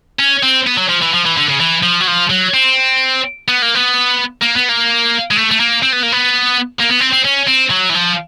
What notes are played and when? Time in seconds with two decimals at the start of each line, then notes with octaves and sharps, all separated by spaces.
0.19 C#4
0.43 C4
0.66 B3
0.77 F#3
0.89 F3
1.01 E3
1.14 F3
1.25 E3
1.37 D3
1.49 C#3
1.60 E3
1.83 F3
2.01 F#3
2.07 F3
2.30 F#3
2.54 C4
3.48 B3
3.62 A#3
3.75 B3
4.42 A#3
4.56 B3
4.69 A#3
5.31 G#3
5.37 A3
5.51 A3
5.60 A#3
5.83 C4
5.93 B3
6.03 A#3
6.12 B3
6.80 A#3
6.89 B3
7.00 C4
7.12 C4
7.25 C#4
7.48 C4
7.71 F#3
7.90 E3
7.95 F3